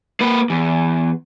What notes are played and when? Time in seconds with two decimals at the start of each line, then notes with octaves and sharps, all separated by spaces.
0.21 A#3 B4
0.50 E2